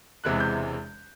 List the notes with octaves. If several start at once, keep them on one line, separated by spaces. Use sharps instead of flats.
E1 E2 C3 E3 G#3 F#6
G6